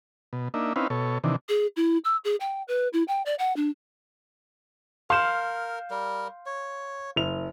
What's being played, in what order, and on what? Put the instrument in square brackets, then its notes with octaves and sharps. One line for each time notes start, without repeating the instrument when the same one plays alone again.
[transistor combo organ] B2
A#3 D4 D#4 E5
C4 C#4 D#4 E4 B4 F5
B2 A4 C#5
C3 D#3 E3 D4
[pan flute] G#4
E4
E6
G#4
G5
B4
E4
G5
D5
F#5
D4
[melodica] A#4 [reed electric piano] F5 F6 G6 [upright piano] C6 E7
[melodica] G3 A#4
C#5
[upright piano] F#1 F7